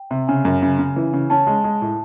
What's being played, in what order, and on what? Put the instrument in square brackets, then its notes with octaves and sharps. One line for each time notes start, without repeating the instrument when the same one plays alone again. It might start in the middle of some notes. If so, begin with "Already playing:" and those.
Already playing: [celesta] G5
[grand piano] C3
[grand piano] C#3 [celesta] G#5
[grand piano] F#2
C#3
C#3
E3
C#3
[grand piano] C#4 [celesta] A5
[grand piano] G#3
G#3
A2